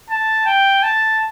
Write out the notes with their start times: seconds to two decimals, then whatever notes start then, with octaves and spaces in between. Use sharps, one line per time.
0.10 A5
0.46 G5
0.83 A5